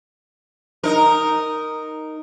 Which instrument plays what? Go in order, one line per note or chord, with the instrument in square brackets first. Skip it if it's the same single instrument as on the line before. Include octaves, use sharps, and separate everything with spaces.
[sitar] D#4 A#4